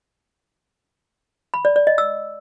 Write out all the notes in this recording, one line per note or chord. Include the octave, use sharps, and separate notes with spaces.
B5
D5
D5
D#5
E6